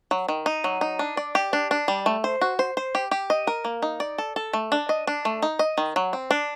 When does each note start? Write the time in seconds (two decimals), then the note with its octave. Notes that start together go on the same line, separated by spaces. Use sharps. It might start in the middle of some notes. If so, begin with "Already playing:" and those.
0.11 F#3
0.28 D#3
0.46 D#4
0.64 F#3
0.81 D#4
0.99 D4
1.17 D5
1.35 G4
1.53 D4
1.71 D4
1.88 G3
2.06 A3
2.24 C5
2.41 F#4
2.59 C5
2.77 C5
2.95 G4
3.11 G4
3.30 D#5
3.47 A#4
3.65 A#3
3.82 D#4
4.00 D5
4.18 A4
4.36 A4
4.53 A3
4.72 D4
4.89 D#5
5.07 D4
5.25 A3
5.42 D#4
5.59 D#5
5.78 D#3
5.96 F#3
6.13 C4
6.31 D4